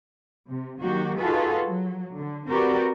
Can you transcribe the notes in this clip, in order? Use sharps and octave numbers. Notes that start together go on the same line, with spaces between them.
C3
D#3 F#3 A#3 F#4 G4
D#4 F4 F#4 G#4 A4 B4
F#3
D3
C4 F#4 G4 A#4 B4 D5